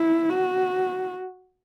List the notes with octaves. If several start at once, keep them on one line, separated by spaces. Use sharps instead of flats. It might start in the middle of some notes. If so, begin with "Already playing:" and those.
Already playing: E4
F#4